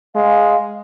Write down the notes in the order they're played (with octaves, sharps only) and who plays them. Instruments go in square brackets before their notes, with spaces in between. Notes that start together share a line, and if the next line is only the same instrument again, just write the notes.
[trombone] G#3 [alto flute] F5